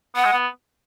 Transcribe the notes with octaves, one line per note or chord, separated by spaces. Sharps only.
B3 F#5
G#3
B3